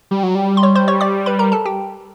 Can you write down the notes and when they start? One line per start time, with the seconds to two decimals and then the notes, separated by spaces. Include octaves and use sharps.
0.11 G3
0.23 F#3
0.35 G3
0.57 C6
0.63 C#5 C#6
0.75 C5 C6
0.88 C#5 C#6
1.01 D5 D6
1.26 B4 B5
1.39 A#4 A#5
1.52 A4 A5
1.65 G4 G5